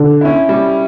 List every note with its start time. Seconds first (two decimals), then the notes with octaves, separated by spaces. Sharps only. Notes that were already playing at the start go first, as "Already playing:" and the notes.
Already playing: D3
0.21 C#4 E4
0.49 G3